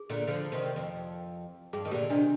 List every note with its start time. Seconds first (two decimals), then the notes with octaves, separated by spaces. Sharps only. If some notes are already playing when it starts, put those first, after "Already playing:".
Already playing: G#4
0.10 A#2 D3
0.27 D3 F3
0.52 C3 D#3
0.76 F2
1.73 G2 G#4
1.85 D#3
1.91 A#2 D3 G4
2.09 C3 D#3 D4